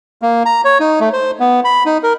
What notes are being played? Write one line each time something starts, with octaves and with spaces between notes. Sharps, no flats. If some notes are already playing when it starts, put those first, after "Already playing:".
A#3
A#5
C#5
D#4
A3
C5
B3
B5
D#4
A#4